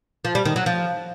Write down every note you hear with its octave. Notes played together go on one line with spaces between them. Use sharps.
F3
G3
D#3
F#3
F3